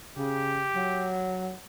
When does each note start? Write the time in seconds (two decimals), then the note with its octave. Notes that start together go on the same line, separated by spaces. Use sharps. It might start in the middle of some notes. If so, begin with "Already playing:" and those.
0.17 C#3 G4
0.76 F#3